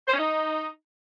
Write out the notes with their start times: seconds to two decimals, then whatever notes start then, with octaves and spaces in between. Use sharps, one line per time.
0.07 C5
0.13 C#4
0.18 D#4